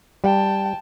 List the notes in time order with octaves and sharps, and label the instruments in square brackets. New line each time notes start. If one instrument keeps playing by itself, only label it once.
[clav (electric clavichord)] G3 [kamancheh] G5 A5